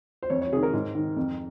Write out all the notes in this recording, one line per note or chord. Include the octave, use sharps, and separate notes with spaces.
C5
F2 C#5
C#5
C3 D#3 G#4
A#4
G#2
D#3
F2